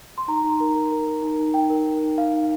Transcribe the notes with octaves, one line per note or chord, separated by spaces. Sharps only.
C6
D#4 A#5
D#4
A#4
A#4
A#4
A#4
D#4
D#4
D#4 G5
A#4
A#4
D#4
D#4 F5
D#4